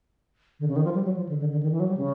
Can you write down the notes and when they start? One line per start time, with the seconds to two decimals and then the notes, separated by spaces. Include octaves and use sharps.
0.60 D3
0.68 C#3
0.76 D#3
0.85 F3
0.94 G3
1.05 F#3
1.17 F3
1.29 D3
1.40 D3
1.51 D3
1.63 D#3
1.71 E3
1.80 F#3
1.89 G3
1.97 C#3